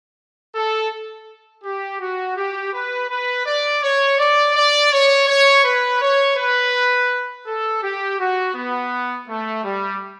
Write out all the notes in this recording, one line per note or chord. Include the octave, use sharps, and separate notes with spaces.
A4
G4
F#4
G4
B4
B4
D5
C#5
D5
D5
C#5
C#5
B4
C#5
B4
A4
G4
F#4
B3
A3
G3